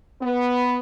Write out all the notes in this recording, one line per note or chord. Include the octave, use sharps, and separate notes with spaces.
B3